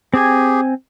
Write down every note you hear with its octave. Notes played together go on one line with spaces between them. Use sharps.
C4 G4 G#4 G#5